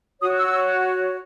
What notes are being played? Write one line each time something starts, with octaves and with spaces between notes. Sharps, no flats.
F#4 C#5 D#6
E6